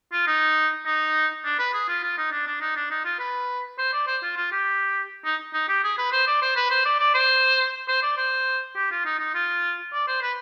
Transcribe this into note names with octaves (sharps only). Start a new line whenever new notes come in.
F4
D#4
D#4
D4
B4
G#4
F4
F4
D#4
D4
D4
D#4
D4
D#4
F4
B4
C5
D5
C5
F4
F4
G4
D#4
D#4
G4
G#4
B4
C5
D5
C5
B4
C5
D5
D5
C5
C5
D5
C5
G4
F4
D#4
D#4
F4
D5
C5
B4